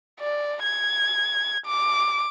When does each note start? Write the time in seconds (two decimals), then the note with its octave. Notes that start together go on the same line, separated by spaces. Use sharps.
0.20 D5
0.64 G#6
1.66 D6